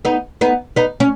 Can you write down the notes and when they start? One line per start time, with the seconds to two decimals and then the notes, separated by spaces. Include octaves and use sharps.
0.05 B3 D#4
0.41 B3 D#4
0.76 B3 D#4
1.00 C#4